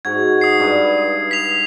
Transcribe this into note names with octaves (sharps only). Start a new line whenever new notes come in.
G#2 F#4 G#6
D#6 C7
G2 G#4 B4
B6 F7